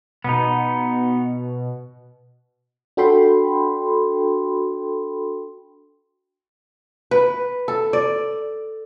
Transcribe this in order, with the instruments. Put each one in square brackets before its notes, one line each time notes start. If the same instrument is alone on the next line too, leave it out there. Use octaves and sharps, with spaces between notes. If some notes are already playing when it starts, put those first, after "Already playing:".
[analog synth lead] B2 [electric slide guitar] B3 D#4
[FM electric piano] D4 F#4 A4 G5 B5 C6
[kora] B4
A4
D5